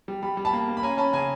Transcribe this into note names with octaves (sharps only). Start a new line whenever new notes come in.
G3
G3 B5
G3
A5 B5
A#3
A#3
B5
C#4 G#5 A#5
C#4 A5 B5
C#3 G#5 A#5